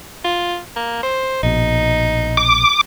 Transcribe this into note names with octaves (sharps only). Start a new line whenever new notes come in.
F4
A#3
C5
A#1 B2 D#4
D6